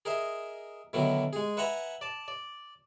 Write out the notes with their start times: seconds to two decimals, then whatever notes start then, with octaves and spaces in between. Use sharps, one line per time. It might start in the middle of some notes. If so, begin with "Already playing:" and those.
0.05 G#4 A#4 D#5 E5
0.93 B2 D3 D#3 F#3 E4 A#4
1.33 G#3 G#4
1.57 B4 E5 F#5 G#5 A#5 B5
2.01 D5 A5
2.28 D5